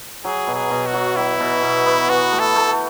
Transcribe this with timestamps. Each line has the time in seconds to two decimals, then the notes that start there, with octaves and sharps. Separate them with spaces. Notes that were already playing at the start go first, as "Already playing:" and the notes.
0.25 F#3 G#4
0.47 B2
0.55 G#4
0.71 B2
0.86 F#4
0.94 F#3
1.17 F#3 E4
1.40 B2
1.63 B2
1.86 B3
2.09 E3 F#4
2.32 A3
2.39 A4
2.55 A3